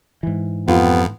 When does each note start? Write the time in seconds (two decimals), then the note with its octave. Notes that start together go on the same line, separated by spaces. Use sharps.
0.23 G#2 E3
0.68 F2 B3 F4 G4